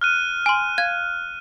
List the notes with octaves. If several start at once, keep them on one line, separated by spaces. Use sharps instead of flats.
F6 F#6 D#7
G#5 C6
F5 G#6